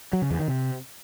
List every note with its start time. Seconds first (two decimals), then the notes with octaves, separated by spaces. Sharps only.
0.13 F#3
0.22 C#3
0.31 E2
0.39 D#3
0.48 C3